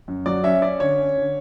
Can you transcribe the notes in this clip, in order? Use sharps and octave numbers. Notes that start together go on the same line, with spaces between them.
F#2
F#3 D5
C#4 E5
C#4 D5
D3 C#5
C#4
D3